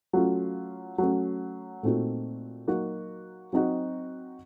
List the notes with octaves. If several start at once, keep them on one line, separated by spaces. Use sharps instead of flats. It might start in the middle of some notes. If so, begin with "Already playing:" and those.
F#3 A3 C#4 F4
F#3 A3 C#4
A#2 A3 C4 D#4 F#4
F#3 A#3 D#4 F#4
F#3 C4 D#4 F#4